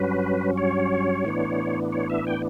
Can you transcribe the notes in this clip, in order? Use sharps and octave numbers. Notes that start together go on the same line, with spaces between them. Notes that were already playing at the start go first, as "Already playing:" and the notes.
Already playing: G2 F#3 C#4 B4
C#5
A2 E3 B3 D4
C#5
E5
G5